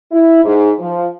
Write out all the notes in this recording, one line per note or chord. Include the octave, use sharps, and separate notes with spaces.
E4
G#2
F3